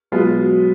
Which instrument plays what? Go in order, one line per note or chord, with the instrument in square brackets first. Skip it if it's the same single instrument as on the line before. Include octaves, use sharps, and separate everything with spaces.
[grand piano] B2 G#3 B3 F4 [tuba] F#3